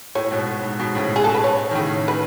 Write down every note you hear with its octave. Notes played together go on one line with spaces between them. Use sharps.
A2 C#5
G#2 B2
A2
G#2
G#2 B2
A2 C#3
G#4
A4
B4
C#5
D#3
A2 C#3
B4